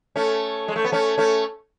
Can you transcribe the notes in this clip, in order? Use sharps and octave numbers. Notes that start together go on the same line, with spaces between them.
A3 C#4
G#3
A3
B3
A3 C#4
A3 C#4